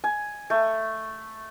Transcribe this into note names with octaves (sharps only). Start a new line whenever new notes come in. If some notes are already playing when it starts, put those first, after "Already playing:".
G#5
A3